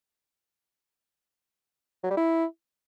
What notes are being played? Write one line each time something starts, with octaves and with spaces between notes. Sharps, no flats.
F#3
G3
E4